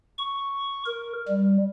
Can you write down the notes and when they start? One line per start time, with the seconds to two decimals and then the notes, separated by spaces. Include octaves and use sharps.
0.18 C#6
0.86 A#4
1.28 G3